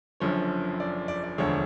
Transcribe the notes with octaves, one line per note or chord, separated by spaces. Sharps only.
F#1 F#2 D3 F3 C#5
D5
D5
D5
E1 D2 D3 F3 C#5